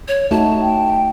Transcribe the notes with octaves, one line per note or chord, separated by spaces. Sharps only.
C#5
A3 D#4 F#4 A5
G5